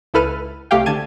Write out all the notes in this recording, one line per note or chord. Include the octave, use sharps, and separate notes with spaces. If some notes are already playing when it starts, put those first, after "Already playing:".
C#2 E4 A4 B4 F6 D#7
C2 A3 G4 F5 G5
D3 A5 G#6 D#7